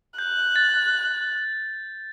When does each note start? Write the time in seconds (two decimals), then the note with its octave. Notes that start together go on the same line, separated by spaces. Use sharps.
0.19 F#6 G6
0.56 A6